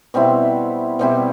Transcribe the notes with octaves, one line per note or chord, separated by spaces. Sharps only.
B2 G3 C4 E4
B2 G3 C4 E4